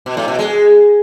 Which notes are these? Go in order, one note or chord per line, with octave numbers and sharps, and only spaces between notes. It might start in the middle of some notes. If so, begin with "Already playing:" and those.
B2
A2
B2
G#3